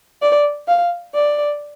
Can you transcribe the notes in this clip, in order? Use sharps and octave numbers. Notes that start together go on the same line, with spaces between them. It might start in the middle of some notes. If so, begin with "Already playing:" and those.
D5
F5
D5